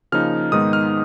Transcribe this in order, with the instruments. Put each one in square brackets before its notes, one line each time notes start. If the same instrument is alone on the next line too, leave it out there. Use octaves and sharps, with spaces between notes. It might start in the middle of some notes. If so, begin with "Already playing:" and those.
[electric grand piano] C#3 F3 A#3 D#4 F6
G#2 D#3 G#3 B3 D#4 D#6
F6